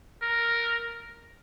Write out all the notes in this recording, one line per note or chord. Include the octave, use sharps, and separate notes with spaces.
A#4